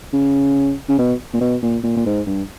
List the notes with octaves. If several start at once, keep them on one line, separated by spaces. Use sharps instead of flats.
C#3
C#3
B2
A#2
B2
A#2
A#2
A#2
G#2
G2